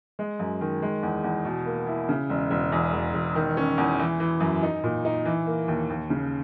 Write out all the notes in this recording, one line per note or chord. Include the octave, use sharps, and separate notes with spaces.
G#3
F#2
D#3
G#3
E2
E2
B2
A#3
E4
C#3
E1
E1
E2
E1
E1
D#3
C#4
E2
E3
E3
F#2
D#4
A#2
D#4
E3
A#3
D#2
D#2
C#3